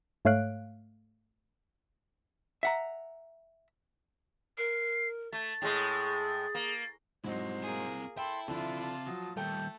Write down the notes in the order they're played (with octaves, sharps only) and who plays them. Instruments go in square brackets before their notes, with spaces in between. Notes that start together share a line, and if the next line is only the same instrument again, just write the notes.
[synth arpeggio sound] G#2 A3 C#5 F5 F#6 D7
[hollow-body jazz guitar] E5 F#5 A#5
[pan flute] A#4 [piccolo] C7
[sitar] A3 [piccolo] A6
[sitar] A2 G#3 [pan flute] G#4
[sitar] A#3
[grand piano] G#2 F#3 D#4 [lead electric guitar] C4 E4 [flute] C5
[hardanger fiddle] A#3 G#4
[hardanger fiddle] A4 [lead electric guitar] E5 B5 [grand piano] G5 [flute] C6
[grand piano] D3 F3 [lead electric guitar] C4 E5 [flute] E4 [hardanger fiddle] F4 A5
[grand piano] F3 F#3 [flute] D#6
[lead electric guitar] D#3 G3 [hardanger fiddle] A3 [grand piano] A4 G5 [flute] G6